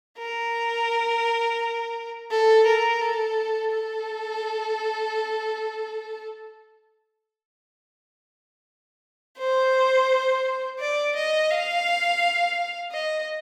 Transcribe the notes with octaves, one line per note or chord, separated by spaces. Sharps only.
A#4
A4
A#4
A4
A4
C5
D5
D#5
F5
D#5